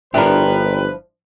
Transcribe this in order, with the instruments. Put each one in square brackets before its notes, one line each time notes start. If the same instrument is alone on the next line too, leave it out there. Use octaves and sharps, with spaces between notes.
[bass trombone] G1 [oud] F3 D4 E4 [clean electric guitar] G4 A#4 [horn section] B4